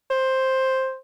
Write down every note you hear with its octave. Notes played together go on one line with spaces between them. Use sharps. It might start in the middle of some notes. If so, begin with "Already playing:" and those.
C5